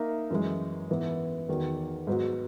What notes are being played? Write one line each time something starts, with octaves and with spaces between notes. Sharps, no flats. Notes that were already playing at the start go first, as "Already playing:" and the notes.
Already playing: A#3 D#4 A#4 E5
F#2 E3 G#3
G#2 E3 B3
E2 D#3 F#3
G#2 F#3 B3 F#4